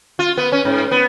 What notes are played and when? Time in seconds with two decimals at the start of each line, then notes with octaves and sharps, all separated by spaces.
0.19 F4
0.38 B3
0.52 C#4
0.65 G#2
0.91 B3